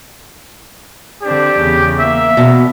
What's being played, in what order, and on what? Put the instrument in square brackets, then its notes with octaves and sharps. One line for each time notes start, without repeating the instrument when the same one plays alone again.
[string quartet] D3 C4 D4 [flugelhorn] G4
[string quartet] E2 C#3
[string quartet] A#3 [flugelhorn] E5
[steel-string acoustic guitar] B2